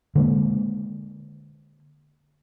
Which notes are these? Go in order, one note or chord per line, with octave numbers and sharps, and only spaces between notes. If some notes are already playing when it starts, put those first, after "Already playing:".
D3 G#3 A#3